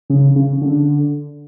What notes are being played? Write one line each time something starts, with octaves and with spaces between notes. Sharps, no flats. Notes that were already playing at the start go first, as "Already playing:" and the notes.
C#3
C#3
D3